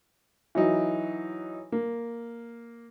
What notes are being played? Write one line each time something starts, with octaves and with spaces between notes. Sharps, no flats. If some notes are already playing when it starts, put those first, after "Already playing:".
E3 F#3 D#4
A#3